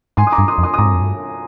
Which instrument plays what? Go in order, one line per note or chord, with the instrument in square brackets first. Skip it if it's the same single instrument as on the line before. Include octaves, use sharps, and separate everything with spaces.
[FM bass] G#2 [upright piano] G#5 C6
[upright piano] D#6
A#5 D6
[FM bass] G2
[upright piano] C6 D#6
[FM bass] F2
[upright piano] C6 D#6
D#6
[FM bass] G#2 [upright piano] A#5 D6
[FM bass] G2
F2
G2